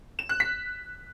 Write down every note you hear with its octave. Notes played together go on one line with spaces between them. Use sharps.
E7
F#6
B6